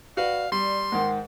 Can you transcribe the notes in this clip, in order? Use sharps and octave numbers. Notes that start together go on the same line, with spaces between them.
F#4 B4 D5 F5
G3 D5 C6
G#2 D#3 F#5